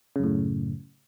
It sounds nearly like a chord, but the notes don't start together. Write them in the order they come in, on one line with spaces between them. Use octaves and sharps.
C#3 F#2 A2